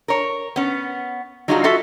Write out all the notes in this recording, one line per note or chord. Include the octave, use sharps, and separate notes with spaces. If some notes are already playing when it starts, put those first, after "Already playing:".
A#4 C#5
B3 C#4
F#3 G3 D#4 F4 F#4 G#4
F4 F#4 A4 E5